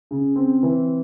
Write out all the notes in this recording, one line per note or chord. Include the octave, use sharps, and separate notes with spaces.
C#3
C4
E3